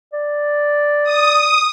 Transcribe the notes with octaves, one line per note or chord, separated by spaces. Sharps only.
D5
D#6